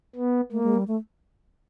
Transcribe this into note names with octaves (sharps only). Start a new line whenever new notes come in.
B3
A3 A#3
G#3
G3
A3